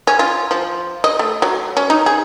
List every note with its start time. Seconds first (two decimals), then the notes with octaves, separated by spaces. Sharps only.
0.07 C#4
0.19 F4
0.51 F3
1.04 D#5
1.19 A3
1.42 F#3
1.77 C#4
1.90 D#4
2.06 G#4